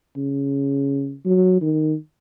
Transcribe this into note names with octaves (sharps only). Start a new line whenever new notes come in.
C#3
F#3
D#3